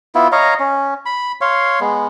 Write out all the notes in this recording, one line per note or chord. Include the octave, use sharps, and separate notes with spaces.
B3 E4 F4
C#5 D#5 F5 A#5
C#4
B5
C#5 F5 C6
G#3 B3